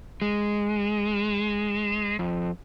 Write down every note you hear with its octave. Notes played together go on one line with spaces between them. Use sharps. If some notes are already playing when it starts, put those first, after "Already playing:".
G#3
F2